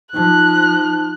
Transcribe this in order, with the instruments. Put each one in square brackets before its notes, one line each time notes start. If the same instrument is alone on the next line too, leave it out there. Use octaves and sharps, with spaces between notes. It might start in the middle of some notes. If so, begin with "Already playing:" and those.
[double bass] F3 [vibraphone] D#4 A5 [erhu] F#6